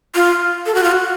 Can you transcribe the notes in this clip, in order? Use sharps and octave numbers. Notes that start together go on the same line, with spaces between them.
F4
A4
F#4
F4
F#4